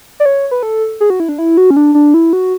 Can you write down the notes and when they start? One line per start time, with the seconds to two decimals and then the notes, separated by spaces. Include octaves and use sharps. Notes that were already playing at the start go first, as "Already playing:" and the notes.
0.20 D5
0.26 C#5
0.51 B4
0.63 A4
1.00 G#4
1.10 F#4
1.20 E4
1.29 D4
1.39 E4
1.57 F#4
1.70 C#4
1.76 D4
1.95 D4
2.14 E4
2.33 F#4